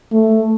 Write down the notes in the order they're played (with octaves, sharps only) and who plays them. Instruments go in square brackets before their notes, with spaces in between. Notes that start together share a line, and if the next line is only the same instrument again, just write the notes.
[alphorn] A3